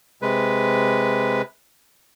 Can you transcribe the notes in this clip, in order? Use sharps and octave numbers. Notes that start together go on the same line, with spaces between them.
C3 G#3 B4